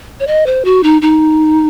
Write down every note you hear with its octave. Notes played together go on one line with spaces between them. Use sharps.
C#5
D#5
C5
F#4
D#4
D#4